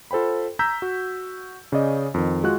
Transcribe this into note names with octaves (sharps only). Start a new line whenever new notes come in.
F4 A4 C5 G5 B5
A#5 E6 G6 B6
F#4
C#3 C#4 D5 D#5
F2 D#3
G#3 F4 F#4 F#6